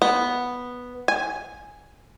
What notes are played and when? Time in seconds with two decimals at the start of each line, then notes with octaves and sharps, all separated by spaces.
0.02 B3
1.08 G#5